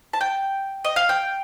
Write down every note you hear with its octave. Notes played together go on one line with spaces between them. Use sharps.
A5
G5
D#5
F5
G5